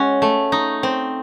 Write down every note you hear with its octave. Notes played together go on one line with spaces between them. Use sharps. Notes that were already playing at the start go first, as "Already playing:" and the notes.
Already playing: G#3 C#4 F#4
A3
D#4
C4